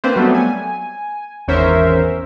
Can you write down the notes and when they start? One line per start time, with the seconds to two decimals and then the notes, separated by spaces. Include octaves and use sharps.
0.04 A#3 C4 D4 B4 C5
0.16 F#3 G3 A3 B3
0.34 G#5
1.48 G#1 E2 C#4 A#4 C5 E5